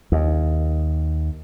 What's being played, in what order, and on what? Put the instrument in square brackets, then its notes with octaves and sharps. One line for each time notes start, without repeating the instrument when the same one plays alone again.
[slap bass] D#2